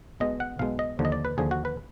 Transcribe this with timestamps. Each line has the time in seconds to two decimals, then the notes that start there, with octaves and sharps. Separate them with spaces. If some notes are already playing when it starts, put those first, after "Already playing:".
0.20 B1 B2 G#3 D#5
0.40 F#5
0.59 B1 B2 G#3 F5
0.79 D#5
0.99 D#2 D3 F3
1.05 D#5
1.12 D5
1.25 B4
1.38 D#2 D3 F3 G#4
1.51 F#4
1.65 B4